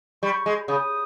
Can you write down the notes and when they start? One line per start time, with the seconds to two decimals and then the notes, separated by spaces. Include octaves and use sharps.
0.23 G3 C#6
0.46 G#3
0.68 C#3 D#6